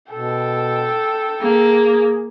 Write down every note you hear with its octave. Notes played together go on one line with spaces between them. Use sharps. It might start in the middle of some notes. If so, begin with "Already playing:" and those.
B2 A4 G5
A#3 G#4